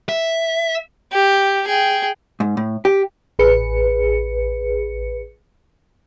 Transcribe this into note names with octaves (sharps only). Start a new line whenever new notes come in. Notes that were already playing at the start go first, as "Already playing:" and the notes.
E5
G4
G#4 G5
G#2
A2
G4
A1 G#4 B4 C#7